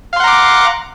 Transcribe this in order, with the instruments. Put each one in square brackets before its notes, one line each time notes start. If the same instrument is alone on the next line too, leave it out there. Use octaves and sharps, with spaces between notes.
[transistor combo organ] F5
C6
F#5
A#5
D6